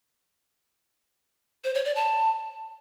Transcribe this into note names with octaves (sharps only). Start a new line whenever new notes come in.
C5
C#5
D5
A5